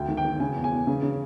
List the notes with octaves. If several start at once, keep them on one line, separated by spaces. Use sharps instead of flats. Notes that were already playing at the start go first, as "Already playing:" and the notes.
Already playing: D2 G5
D#3
G5
D#3
C#3 G#5
E2
G#5
E2
C#3
C#3